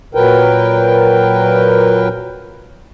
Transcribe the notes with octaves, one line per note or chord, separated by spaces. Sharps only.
A#2 F#3 A#4 B4 G5